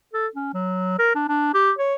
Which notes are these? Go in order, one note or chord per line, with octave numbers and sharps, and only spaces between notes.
A4
C#4
F#3
A#4
D4
D4
G4
C#5